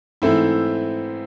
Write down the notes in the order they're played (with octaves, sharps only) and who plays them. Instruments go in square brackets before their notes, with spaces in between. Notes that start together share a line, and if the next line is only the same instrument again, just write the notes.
[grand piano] G#2 E3 A3 C4 E4